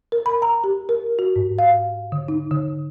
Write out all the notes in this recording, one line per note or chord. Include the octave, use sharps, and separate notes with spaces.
A#4
B5
A#5
G4
A#4
F#4
G#2
F5
D3
D#4
D3